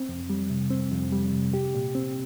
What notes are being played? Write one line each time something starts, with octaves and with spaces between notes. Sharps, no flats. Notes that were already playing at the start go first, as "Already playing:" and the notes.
Already playing: C4
F2
G3
C3
C4
F2
G3
C3
G4
A#2
C4